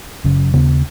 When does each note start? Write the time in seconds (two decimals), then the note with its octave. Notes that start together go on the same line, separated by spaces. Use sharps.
0.24 F#1 F#2 C#3 F#3
0.54 D#2 C#3 B3